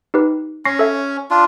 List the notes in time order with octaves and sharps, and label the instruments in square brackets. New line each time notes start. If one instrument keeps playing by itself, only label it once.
[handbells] D#4 G4 B4
[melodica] C#4 [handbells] C#6 A#6 C7
[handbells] A4 C#5 E5
[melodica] D4 F4